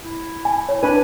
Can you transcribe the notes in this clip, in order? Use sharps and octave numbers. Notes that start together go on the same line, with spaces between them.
E4
G#5
C#5
D4 B4 G#5